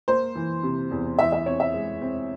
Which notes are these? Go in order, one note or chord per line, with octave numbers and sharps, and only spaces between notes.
A#3 C5
E3
C3
E2
E3 E5
E5
C4 C#5
E5
G#3
C4